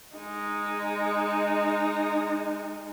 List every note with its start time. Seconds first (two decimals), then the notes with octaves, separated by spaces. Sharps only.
0.16 G#3 D#4